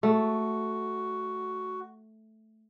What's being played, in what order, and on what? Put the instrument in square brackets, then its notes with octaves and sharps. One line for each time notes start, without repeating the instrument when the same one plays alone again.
[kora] A3 [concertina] F#4